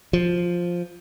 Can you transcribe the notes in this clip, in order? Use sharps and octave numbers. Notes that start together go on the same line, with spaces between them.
F3